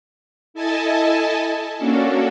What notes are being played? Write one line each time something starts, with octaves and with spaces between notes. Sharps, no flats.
E4 A4 D#5 G#5 A5
A#3 C#4 D4 F#4 A4